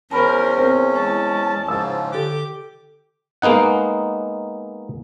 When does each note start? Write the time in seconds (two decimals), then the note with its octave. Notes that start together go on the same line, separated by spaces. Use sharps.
0.11 E2 C#4 A#4 C5 A5 B5 F6
0.58 C4
0.96 G#3 E4 C5 A5 C#6
1.68 G#2 C#3 F3 E6
2.12 D3 G4 A4 D6
3.42 G#3 A#3 B3 D#4 F#5